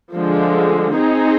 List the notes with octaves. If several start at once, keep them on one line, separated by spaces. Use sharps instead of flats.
D3 F3 G#3
C4 D#4 G#4